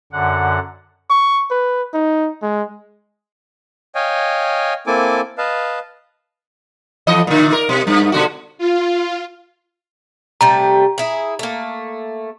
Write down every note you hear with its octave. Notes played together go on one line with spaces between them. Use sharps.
F#2 D3 F#5
C#6
B4
D#4
G#3
C#5 D#5 F5 G5 G#5
A#3 C4 E4 A4 G#5 D6
B4 D#5 F5 A5
F2 E3 D#5
A#2 D3
A#4
B2
G2
B2 D3 F#4
F4
C3 G3 A3 A#5
E4 G#4
A3 A#3